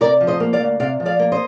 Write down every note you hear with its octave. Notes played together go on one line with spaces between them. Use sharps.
C3 A#4 D5
F3
C5 D#5
A#3
D5 F5
D2
C3 D5 F5
F3
D5 F5
A#3
C5 D#5